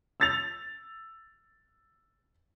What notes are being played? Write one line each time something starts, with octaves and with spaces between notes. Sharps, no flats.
E6 A6 F7